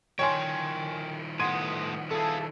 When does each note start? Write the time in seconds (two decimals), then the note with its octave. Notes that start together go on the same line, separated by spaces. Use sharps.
0.19 D#3 F3 A#4 C#5 G5 G#5 C6
1.40 A2 B3 F#5 C6 D#6 G#6 D#7
2.11 B3 E4 G#4 A4 F5 A5